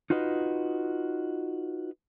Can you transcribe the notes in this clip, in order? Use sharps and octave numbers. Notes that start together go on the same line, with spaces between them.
D#4 F4 F#4 B4 D#5